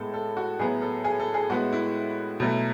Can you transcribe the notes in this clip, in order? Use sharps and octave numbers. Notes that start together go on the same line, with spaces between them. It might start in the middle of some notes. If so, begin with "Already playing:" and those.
Already playing: A2 G#3 B3 A4
A4
F#4
A2 F#3 B3 G#4
A4
G#4
A4
G#4
A2 G#3 B3 F#4
E4
B2 F#3 A3